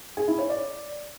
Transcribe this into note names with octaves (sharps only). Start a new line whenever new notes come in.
G#4
E4
C#5
D5